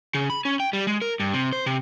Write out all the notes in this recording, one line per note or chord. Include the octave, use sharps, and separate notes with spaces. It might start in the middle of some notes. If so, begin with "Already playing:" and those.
C#3
B5
C#4
G5
G3
G#3
A#4
G2
C3
C5
C3